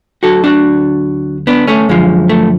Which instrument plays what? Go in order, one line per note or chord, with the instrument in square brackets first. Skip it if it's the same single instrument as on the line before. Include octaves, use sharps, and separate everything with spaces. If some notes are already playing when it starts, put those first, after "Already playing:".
[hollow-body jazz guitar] D2 D3 F#3 F#4 A4
D4 F#4
B3 D4
A3 C#4
F#2 D3 F3 G#3
A3